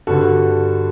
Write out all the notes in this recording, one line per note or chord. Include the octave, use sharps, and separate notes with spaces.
G2 D3 F#4 A4